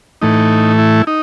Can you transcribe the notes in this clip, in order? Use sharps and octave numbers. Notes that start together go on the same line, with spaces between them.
A2 E3 A3 D#4
E4
D#4